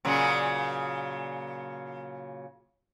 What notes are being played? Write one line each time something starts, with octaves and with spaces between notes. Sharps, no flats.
A#2 C#3 F#3